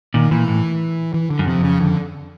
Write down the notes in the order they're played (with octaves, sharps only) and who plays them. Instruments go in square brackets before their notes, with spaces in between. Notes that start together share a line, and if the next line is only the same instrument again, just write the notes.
[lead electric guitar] A#2 [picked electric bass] D#3
[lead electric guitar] A#2 [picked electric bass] E3
[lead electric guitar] A2
[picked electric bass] E3
D3
[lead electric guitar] F#2
[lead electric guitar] F2 [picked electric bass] C3
[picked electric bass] C#3
D3